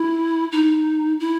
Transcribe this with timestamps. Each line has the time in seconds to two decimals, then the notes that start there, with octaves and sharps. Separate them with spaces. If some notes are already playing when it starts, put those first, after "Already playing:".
Already playing: E4
0.52 D#4
1.20 E4